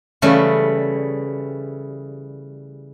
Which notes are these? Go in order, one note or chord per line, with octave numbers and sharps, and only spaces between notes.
C#3 E3 G3 A3